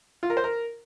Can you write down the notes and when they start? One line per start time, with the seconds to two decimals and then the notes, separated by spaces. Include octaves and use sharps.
0.23 F4
0.30 A#4
0.37 C5
0.44 A#4